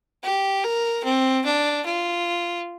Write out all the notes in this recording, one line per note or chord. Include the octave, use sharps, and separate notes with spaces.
G4
A#4
C4
D4
F4